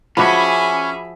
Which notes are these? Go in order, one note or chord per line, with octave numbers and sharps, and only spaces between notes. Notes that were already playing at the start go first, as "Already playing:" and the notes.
F3 C#4 F#4 G#4 C#5 E5 B5 D6